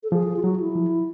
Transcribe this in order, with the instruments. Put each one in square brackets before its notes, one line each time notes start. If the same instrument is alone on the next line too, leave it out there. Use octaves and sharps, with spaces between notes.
[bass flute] A4
[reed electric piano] F3 [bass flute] G#4
[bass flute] F4
[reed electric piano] F#3 [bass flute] F#4
[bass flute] E4
[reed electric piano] F3